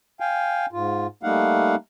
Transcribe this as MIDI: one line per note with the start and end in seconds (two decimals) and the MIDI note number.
0.20 0.66 77
0.20 0.66 79
0.20 0.66 80
0.73 1.07 44
0.73 1.07 65
1.23 1.75 55
1.23 1.75 57
1.23 1.75 58
1.23 1.75 63
1.23 1.75 77
1.23 1.75 78